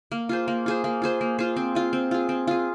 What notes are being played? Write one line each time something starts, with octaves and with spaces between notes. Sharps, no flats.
A#3
F4 G#4 C5
A#3
F4 G#4 C5
A#3
F4 G#4 C5
A#3
F4 G#4 C5
C4
F4 G#4
C4
F4 G#4
C4
F4 G#4